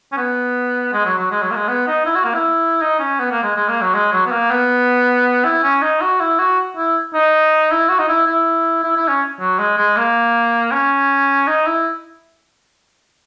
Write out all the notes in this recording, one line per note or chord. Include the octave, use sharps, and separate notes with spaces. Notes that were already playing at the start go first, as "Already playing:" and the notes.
C#4
B3
G#3
F#3
F#3
G#3
F#3
A#3
G#3
B3
D#4
E4
F#4
A#3
E4
D#4
C#4
B3
A#3
G#3
G#3
A#3
F#3
G#3
F#3
B3
A#3
B3
E4
C#4
D#4
F#4
E4
F#4
E4
D#4
E4
F#4
D#4
E4
E4
E4
E4
C#4
F#3
G#3
G#3
A#3
C#4
D#4
E4